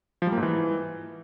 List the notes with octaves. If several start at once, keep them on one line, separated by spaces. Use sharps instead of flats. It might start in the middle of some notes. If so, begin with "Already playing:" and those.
F3
G3
A#3
G#2
E3